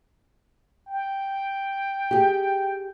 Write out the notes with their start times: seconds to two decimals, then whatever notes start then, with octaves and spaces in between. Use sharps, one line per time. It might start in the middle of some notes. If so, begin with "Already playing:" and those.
0.88 G5
2.11 G4 G#4